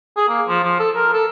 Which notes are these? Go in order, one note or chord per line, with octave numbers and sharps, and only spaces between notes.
G#4
A#3
F3
F3
A4
A#4
A4